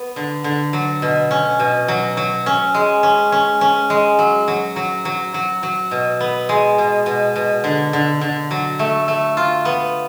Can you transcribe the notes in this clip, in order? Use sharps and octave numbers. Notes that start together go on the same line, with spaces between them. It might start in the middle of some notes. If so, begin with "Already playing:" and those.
Already playing: B3
D3
D3
F#3
B2
C#4
B2
F#3
F#3
C#4
G#3
C#4
C#4
C#4
G#3
F#3
F#3
F#3
F#3
F#3
F#3
B2
B3
G#3
B2
B2
B2
D3
D3
D3
F#3
A3
A3
F4
B3